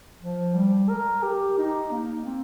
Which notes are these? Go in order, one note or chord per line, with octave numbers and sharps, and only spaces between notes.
F3
G3
A#4
G4
D#4
A#3
C4